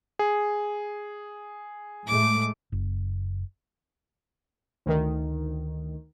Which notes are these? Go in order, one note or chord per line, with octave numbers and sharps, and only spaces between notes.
G#4
A2 G#3 A3 D6
F#1
D2 D#3